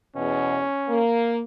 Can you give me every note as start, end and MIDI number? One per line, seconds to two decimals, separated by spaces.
0.16 0.60 40
0.16 0.60 47
0.16 1.01 61
0.89 1.41 58